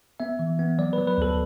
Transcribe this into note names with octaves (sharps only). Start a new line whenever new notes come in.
B3 E5
E3
B3
F#3 D5
F#3 B4
B4
D2 A4